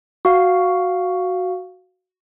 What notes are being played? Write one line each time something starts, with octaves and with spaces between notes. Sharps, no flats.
F#4 F5